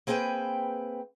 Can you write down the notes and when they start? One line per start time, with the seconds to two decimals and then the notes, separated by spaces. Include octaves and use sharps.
0.07 A#3 C4 G#4 B4 G5